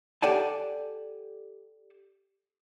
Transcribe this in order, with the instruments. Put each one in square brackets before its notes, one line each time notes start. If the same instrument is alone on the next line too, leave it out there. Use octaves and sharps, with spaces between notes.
[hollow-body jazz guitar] G4 A4 D5 F#5 G#5 A5